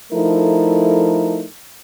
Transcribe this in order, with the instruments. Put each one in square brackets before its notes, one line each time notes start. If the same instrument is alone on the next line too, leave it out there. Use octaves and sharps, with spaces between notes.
[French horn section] F3 A3 D#4 E4 A4 A#4